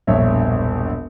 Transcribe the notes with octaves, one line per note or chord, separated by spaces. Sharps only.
E1 A#1 G2 C#5 E5